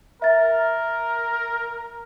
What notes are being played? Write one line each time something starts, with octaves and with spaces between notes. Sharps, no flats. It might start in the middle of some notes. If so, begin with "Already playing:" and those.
A#4 E5 A6